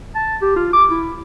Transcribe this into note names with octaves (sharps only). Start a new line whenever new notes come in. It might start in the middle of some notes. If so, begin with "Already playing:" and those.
A5
G4
F4
D6
E4